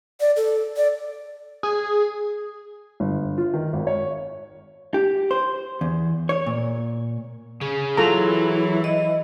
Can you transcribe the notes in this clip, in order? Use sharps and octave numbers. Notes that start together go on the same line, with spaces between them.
D5
A4
D5
G#4
G1
F4
D#3
G#1
C#5
G4
C5
E2
C#5
A#2
C#3 C#4 G#4
E3 F#3 E4 F4 A4 A#5
D#5